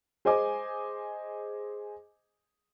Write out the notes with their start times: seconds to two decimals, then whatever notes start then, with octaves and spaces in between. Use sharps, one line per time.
0.25 G#4 C5 D#5 G#5 D6